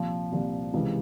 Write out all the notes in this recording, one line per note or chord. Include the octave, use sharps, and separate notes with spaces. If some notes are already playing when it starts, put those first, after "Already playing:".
Already playing: C2 A#2 F3
C2 A#2 F3
C#2 C3 E3